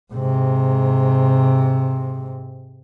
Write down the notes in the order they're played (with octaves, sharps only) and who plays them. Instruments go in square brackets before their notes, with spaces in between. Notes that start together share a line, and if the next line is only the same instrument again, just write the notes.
[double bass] G#2 C3